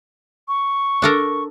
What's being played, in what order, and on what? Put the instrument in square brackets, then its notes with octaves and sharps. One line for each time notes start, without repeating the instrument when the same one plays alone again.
[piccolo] C#6
[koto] D4 A4 A#4